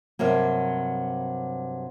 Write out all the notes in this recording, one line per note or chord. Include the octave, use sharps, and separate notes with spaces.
G2 C3 F#3 A#3